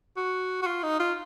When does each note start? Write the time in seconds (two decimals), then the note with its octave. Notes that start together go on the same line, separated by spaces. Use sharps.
0.16 F#4
0.62 F#4
0.66 F4
0.83 D#4
0.99 F4